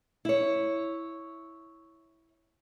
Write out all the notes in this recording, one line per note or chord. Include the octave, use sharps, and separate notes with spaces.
E4 C#5